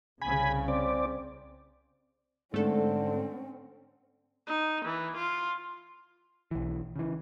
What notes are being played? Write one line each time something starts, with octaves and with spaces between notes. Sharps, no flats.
C2 C#3 G#5 B5
C4 D5
G#2 D3 A3 C4 C#4 A4
D#4
E3
F4
B1 E3
C#3 E3